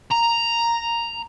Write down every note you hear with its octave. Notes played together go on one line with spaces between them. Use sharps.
A#5